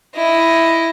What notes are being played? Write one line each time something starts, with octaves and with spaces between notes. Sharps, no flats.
E4 D#5